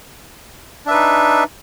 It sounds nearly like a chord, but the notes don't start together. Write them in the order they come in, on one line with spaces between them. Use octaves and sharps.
D4 E5 B4 D#4